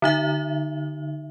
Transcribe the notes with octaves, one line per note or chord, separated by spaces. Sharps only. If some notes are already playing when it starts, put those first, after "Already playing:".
D3 D#4 E5